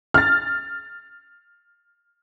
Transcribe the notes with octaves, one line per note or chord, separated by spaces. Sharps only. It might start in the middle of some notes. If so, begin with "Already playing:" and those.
F6 A6